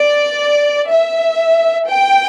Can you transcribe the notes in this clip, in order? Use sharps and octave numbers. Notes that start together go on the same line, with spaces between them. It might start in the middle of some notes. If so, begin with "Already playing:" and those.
Already playing: D5
E5
G5